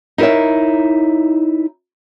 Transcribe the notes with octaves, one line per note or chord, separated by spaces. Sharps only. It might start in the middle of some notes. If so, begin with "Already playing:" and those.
D#4 E4 A#4 C#5 E5